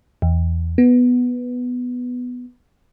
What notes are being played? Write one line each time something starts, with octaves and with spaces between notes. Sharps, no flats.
E2
B3